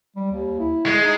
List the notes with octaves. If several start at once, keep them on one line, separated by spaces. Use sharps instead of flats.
G3
D#2
E4
G#3
D#4